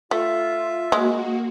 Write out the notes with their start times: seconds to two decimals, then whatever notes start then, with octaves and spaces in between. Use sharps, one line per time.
0.11 A3 F4 E5
0.92 G#3 A#3 F#4